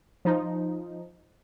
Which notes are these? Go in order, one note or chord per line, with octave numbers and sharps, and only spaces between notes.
F3 D#4